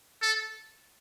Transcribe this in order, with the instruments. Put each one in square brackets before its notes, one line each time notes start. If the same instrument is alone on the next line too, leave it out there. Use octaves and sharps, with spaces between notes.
[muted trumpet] A4